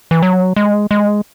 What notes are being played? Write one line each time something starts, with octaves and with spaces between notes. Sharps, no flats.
E3
F#3
G#3
G#3